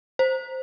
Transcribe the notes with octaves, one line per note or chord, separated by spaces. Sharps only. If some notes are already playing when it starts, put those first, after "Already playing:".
C5